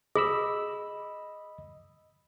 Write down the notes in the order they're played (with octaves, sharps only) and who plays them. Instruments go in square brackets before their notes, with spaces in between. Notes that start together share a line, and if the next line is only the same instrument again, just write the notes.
[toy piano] G#4 [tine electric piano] D#5 B5 E6